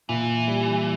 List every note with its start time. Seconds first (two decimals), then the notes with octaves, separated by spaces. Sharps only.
0.09 A#2 E3
0.48 G3